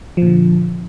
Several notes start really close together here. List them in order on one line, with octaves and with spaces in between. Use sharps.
F3 A#2 D3